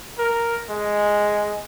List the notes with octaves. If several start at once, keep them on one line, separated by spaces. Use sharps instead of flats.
A#4
G#3